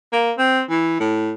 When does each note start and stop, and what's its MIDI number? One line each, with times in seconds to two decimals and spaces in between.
0.12 0.32 58
0.38 0.61 60
0.70 0.99 52
1.00 1.34 45